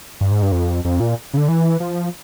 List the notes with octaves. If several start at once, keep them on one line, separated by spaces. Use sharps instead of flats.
G2
G#2
G2
F2
F2
A#2
C#3
D3
E3
F3